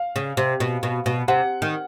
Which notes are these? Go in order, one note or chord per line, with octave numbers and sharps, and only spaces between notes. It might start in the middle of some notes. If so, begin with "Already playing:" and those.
Already playing: F5
C#3
C3
B2
B2
B2
C3 F#5
D#3